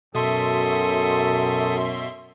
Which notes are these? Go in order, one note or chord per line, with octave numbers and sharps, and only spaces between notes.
F#2 B2 A4 E5 C6 D#6